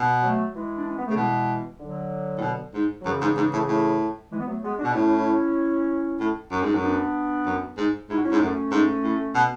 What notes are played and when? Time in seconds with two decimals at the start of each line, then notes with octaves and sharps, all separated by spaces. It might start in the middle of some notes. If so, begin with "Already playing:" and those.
Already playing: B2
0.22 F#3 A3
0.54 E3 G#3
0.77 D4
0.87 C#4
0.97 B3
1.07 C#3 A3
1.16 B2 E3 G#3
1.79 D3 F#3
2.38 A2
2.42 B2
2.74 G#2
3.01 F#3
3.05 F#2 C#3 E3
3.21 G#2
3.37 G#2
3.53 A2
3.68 A2
4.31 E3 G#3
4.40 B3
4.47 F#3 A3
4.62 G#3 B3
4.78 D4 F#4
4.84 B2
4.94 A2 C#4 E4
6.20 A2
6.51 F#2
6.63 G#2
6.75 F#2
6.83 B3 D4
7.46 F#2
7.77 G#2
8.09 G#2 E4
8.16 F#4
8.23 C#4 E4
8.31 G#2
8.40 F#2 A3 C#4
8.71 G#2
9.03 A2
9.35 B2